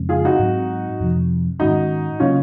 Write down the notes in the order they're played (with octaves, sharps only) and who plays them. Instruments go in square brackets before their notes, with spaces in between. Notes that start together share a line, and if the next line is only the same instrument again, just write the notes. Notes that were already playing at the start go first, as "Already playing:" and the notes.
Already playing: [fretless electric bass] F2 C#3 G#3 C4
[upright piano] F4 G#4
D#4 F#4
[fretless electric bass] G#2 F#3 C4
F2 C3 F3
[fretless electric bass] G#2 D#3 G#3 C#4 [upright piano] D#4 F#4
[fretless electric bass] C#3 F#3 A#3 [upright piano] C#4 F4